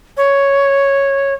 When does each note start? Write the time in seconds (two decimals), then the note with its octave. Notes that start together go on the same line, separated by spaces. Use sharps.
0.17 C#5